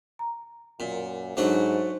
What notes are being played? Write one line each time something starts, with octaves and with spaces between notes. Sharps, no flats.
A#5
F#2 A#2
G#2 F#3 A3 D4 D#4 F#4 C5